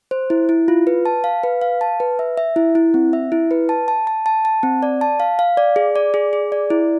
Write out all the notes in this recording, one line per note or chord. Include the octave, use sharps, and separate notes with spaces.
C5
E4
E4
F4
B4
A5
F5
B4
F5
A5
B4
E5
E5
E4
E4
C4
E5
E4
B4
A5
A5
A5
A5
A5
C4
D5
A5
F5
F5
D5
G#4
D5
G#4
G#4
D5
E4